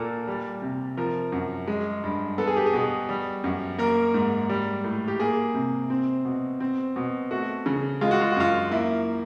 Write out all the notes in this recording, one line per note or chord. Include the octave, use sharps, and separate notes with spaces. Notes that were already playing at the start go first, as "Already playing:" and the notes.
Already playing: A#2 A#3 A4 A#4
G3
C3
F3 A#4
F#2
G#3
G2
B3 A4
G#4
G4
G#4
B2
G3
F#2
A#3 A#4
G#2
G3
A2
G4
A#3 G#4
C3
C4
B2
C4
B2
A3 F#4
C#3
G#3 F4
F#4
F4
F#4
F#2 F4
A#3 E4